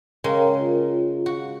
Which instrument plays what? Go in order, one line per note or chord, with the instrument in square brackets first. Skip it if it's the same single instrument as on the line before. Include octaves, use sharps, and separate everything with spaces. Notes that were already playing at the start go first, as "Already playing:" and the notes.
[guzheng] C#3 G#3 [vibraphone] A#4 G5 A#5
[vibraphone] F4
[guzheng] F#4